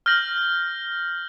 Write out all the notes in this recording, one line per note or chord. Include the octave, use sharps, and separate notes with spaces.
F6 G6 A#6 F#7